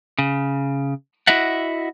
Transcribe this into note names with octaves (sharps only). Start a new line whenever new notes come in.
C#3
E4 F#4 D#5 E5 F#5